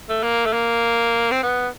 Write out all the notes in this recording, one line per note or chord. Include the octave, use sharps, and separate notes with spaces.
A3
A#3
A3
A#3
C4
B3